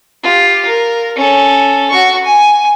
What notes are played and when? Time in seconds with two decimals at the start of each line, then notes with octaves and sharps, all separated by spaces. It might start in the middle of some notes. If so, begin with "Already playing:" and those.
0.22 F4 G4
0.67 A#4
1.16 C#4 A4
1.91 F#4 C#6
2.25 G#5